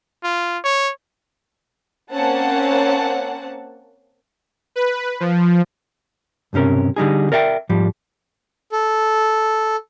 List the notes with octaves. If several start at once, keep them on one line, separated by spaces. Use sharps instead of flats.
F4
C#5
A#3 C4 C#4 F#5 A5
B4
F3
B1 G2 C3 C#4 A#4
D3 G3 D#4 G#4
A#4 D5 E5 F5 G5
G#2 F3 G3
A4